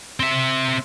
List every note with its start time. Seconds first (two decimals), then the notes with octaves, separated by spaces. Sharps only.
0.20 C4 E5